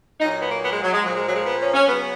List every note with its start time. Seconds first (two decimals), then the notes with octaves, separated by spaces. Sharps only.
0.19 A#2 F#3 D#4
0.30 D#4
0.41 B3
0.51 A#3
0.62 B3
0.72 G#3
0.82 F#3
0.93 G#3
1.03 A#2 F3 F#3
1.15 G#3
1.25 F#3
1.35 G#3
1.46 B3
1.60 C#4
1.74 C#4
1.87 C#3 F#3 B3